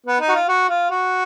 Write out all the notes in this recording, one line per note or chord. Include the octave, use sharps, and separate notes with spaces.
B3
D#4
F#4
F4
F#4
F4
F#4